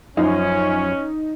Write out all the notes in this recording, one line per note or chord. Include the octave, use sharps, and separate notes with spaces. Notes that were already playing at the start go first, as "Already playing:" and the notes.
F#2 F3 C#4 D#4